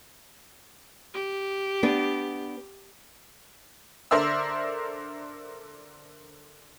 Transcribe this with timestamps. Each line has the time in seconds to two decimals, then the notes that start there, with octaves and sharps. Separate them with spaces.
1.14 G4
1.83 B3 D4
4.11 D3 A#4 C5 D5 E5 E6